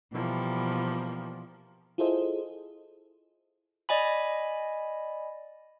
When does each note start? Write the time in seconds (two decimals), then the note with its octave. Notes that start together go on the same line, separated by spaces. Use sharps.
0.12 B2 E3 F3 G3 A#3
1.98 E4 F4 G#4 A4 C5 D#5
3.89 D5 D#5 G#5 B5